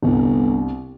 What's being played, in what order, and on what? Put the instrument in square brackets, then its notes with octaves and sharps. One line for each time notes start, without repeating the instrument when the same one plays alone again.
[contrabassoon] G1 [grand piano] C2 C3